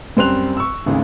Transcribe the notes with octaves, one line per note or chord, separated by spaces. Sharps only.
F#2 G3 C4 C6 F#6 F7
C#6 E6
G#1 D2 C#3